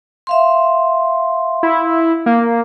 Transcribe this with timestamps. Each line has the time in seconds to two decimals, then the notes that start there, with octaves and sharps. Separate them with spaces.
0.27 E5 F5 C6
1.63 E4
2.26 A#3